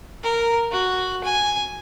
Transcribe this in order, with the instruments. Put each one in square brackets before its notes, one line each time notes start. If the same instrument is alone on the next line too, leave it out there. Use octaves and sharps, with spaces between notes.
[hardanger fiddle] A#4
F#4
G#5